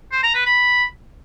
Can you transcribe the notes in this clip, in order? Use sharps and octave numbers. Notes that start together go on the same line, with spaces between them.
C5
A#5
B4
B5